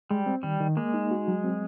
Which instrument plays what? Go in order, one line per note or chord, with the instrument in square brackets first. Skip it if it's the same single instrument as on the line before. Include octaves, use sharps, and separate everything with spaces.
[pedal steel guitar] G3 [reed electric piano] G#3
[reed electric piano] C4
[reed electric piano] D#3 [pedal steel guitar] G3
[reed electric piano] D#3
[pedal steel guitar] G#3 [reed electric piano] A#3
[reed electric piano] D#4
F#4
F#3
C4